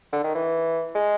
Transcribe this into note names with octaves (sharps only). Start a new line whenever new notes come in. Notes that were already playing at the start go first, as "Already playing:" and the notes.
D3
D#3
E3
G#3